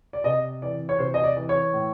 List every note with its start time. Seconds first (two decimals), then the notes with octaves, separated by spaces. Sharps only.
0.13 D5
0.24 C3 D#5
0.62 E3 D5
0.89 C#5
0.99 C3 C5
1.14 D#5
1.24 D5
1.37 E3
1.49 C#5
1.74 A2